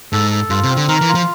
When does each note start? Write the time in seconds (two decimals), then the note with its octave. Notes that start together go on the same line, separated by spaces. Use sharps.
0.12 G#2 A4
0.31 A4
0.50 G2 F4
0.63 C3
0.69 C4
0.77 D3
0.88 D#3 A#4
1.01 E3
1.08 F4
1.15 F3